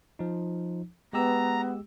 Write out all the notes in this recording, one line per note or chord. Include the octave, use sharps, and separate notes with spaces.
F3 D#4
G#3 B3 G4 A#5 E6